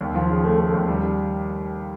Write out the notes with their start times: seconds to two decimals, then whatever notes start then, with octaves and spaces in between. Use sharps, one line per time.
0.01 D#2
0.15 F3
0.29 C#3
0.44 A3
0.59 A3
0.74 D#2
0.88 G3